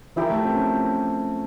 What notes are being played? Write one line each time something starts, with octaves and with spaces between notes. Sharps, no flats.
F3 E4 G4 A#4
A3
C4
C#4